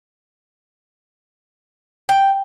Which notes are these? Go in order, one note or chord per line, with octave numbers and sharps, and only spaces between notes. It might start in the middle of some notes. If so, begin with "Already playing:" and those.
G5